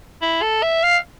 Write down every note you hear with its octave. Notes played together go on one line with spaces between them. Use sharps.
E4
A4
E5
F5